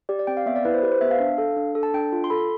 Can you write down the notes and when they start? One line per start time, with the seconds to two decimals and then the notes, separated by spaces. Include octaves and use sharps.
0.09 G4 D5
0.19 D5
0.27 C4 G5
0.37 F5
0.46 B3 E5
0.56 D5
0.65 E4 B4
0.74 C5
0.83 G4 B4
0.92 C5
1.01 B3 E5
1.11 F5
1.20 D4
1.38 A4
1.56 D4
1.75 A4
1.83 A5
1.94 D4 G5
2.13 F4
2.24 C6
2.30 A4 B5